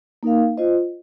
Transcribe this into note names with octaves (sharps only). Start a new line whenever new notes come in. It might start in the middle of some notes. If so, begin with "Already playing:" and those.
A#3 D#4 A#4 F5
F4 C5 D#5